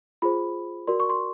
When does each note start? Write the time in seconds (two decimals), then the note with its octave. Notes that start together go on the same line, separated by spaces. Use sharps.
0.22 F4 G#4 C5 B5
0.87 F#4 A#4 D5 C6
1.00 C#6
1.10 C6